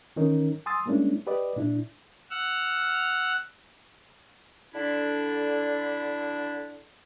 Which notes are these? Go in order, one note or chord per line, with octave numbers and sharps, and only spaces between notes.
D#3 E3 C#4 D#4 A#4
G#5 C6 D#6 E6 A6
G3 G#3 A#3 C#4 D4 E4
G4 B4 D5 D#5
A#2 D4 E4
F#5 E6 F6
D3 D4 E4